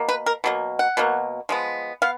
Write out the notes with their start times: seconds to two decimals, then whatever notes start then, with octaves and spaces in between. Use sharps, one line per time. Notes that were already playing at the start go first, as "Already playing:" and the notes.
Already playing: B2 A#3
0.09 B4
0.26 A#4
0.44 B2 F#3 A#3
0.79 F#5
0.97 B2 F#3 A#3
1.49 F3 G#3 B3
2.02 B3 F5